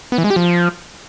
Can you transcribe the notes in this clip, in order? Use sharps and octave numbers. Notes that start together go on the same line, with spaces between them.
B3
E3
G#3
G4
F3